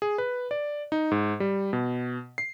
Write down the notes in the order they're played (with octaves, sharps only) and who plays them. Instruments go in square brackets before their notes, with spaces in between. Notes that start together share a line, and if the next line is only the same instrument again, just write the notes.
[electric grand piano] G#4
B4
D5
D#4
G#2
G3
B2
C7